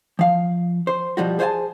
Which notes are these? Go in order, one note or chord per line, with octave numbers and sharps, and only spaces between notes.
F3 F5
C5
B2 F3 G3 F#4
G#4 C5 C#5 F5 G#5 A5